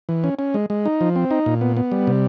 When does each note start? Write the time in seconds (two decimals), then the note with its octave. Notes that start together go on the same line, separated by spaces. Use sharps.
0.09 E3
0.24 C#4
0.39 C#4
0.54 G#3
0.70 G#3
0.86 D#4
1.01 F3
1.16 C4
1.31 D#4
1.46 A#2
1.61 B3
1.77 B3
1.92 G3
2.07 C3